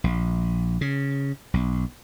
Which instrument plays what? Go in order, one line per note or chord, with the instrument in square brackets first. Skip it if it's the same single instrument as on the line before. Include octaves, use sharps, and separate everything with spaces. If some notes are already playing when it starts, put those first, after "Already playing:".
[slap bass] A#1
C#3
B1